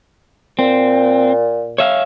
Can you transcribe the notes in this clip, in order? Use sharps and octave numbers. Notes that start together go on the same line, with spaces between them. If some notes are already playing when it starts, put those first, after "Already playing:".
A#2 C4
C#5 E5 F5